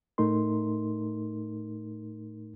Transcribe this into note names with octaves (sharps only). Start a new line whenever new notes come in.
A2 A3 D#4 A#4 C6